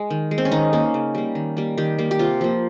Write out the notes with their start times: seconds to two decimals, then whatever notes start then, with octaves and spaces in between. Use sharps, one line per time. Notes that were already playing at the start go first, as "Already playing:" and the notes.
Already playing: G#3
0.10 D#3
0.31 G#3
0.38 C4
0.45 C#4
0.52 D#3 D#4
0.73 A#3 C#4
0.94 C#3
1.15 G3 A#3
1.35 D#3
1.57 G3 A#3
1.78 D#3 G4
1.98 G3 A#3
2.11 G4
2.19 C3 F4
2.41 F3 A#3